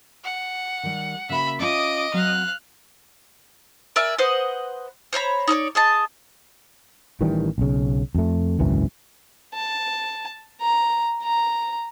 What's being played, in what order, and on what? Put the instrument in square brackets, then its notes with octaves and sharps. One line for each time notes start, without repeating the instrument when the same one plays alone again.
[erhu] F#5
[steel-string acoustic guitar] D#3 G3
[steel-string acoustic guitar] C#3 A#3 F#4 [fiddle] E5 B5
[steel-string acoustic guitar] C#4 F4 [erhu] D#5 [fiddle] D6 D#6
[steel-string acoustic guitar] F#3 C4 F#5 [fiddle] F5 F#6
[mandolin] A#4 D5 E5 G#5
B4 C5 D#5 F#5
C5 C#5 A#5 B5
D#4 A4 C#5 D5
G#4 D#5 A5
[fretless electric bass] A1 D#3 E3 G3
B1 C#3
F2 A3
G#1 C#2 F#2 E3
[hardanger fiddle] A5
A#5
A#5